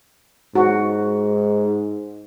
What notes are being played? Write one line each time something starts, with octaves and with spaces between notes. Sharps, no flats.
G#2 F#4